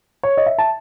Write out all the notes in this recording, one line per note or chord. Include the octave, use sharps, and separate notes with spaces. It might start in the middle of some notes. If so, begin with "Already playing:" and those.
C#5
D#5
E5
A5